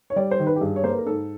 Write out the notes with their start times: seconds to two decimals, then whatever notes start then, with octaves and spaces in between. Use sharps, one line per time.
0.10 C#5
0.16 G3 D5
0.31 C5
0.39 D#3
0.47 B4
0.56 G4
0.61 G2 G#4
0.76 C#5
0.84 A#3 C5
0.91 B4
0.98 A#4
1.06 G#2 A4